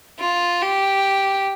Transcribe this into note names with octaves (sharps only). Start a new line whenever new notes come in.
F4
G4